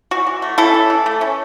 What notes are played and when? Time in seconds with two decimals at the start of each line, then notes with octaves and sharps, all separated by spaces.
0.11 E3 F#4
0.27 E3
0.42 A3
0.58 C#4 E4 A4
0.74 E3
0.90 E3
1.06 A3
1.21 C#4